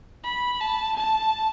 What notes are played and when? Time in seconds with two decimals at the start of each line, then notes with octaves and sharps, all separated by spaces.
0.23 B5
0.61 A5
0.96 A5